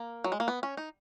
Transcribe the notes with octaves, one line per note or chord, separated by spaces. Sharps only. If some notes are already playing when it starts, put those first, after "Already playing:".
Already playing: A#3
F#3
G#3
A#3
B3
C#4
D#4